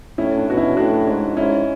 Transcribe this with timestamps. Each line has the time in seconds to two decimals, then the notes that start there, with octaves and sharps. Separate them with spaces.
0.18 A2 C#4 E4
0.38 D4
0.47 B2 F#4
0.57 C#4 E4
0.77 A2 D4 F#4
1.07 G#2 D4
1.37 G#2 C#4 E4